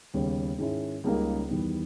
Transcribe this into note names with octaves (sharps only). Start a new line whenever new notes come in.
D#2 C#3 G3 B3
G#2 D#3 G#3 C#4 E4
C#2 C#3 G3 A#3 D#4
E2 D#3 G3 B3